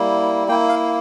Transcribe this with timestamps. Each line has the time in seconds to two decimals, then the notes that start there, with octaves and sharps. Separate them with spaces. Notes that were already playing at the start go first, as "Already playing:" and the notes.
Already playing: G3 A#3 E4
0.48 A#3 E4 G5
0.69 F5